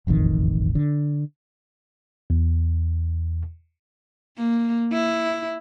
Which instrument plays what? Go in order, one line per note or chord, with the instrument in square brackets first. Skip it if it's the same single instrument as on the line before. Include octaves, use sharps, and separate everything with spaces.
[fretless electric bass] E1 A1 F2 D#3
D3
[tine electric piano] E2
[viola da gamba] A#3
E4